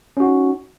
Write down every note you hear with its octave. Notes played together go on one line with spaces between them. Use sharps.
C#4 D#4 F#4